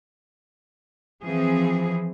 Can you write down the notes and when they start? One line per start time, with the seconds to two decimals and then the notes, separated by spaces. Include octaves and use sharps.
1.23 E3 F3 C4 G#4